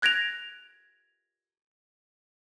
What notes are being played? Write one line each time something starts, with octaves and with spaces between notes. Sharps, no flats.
F#6 G#6 A#6 D7 F7